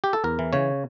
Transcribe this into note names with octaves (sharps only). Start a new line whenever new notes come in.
G4
A4
E2 A#4
E3
C#3 C#5